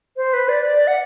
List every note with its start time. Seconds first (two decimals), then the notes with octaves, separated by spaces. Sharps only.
0.17 C5
0.33 B4
0.49 D5
0.65 D5
0.87 F#5